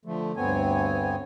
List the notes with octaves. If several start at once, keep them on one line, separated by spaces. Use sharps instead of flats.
D3 F3 A3
D2 G2 B3 C4 C#5 G#5